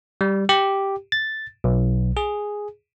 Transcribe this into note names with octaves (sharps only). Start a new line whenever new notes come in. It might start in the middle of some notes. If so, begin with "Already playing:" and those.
G3
G4
A6
B1
G#4